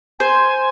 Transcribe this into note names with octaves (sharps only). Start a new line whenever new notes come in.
C5 G#5